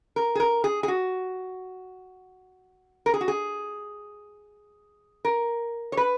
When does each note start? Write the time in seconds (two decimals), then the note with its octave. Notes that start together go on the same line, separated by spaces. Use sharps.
0.16 A#4
0.35 G#4
0.40 A#4
0.64 G#4
0.83 G#4
0.88 F#4
3.06 A#4
3.14 G#4
3.21 F#4
3.28 G#4
5.25 A#4
5.92 C#5
5.97 B4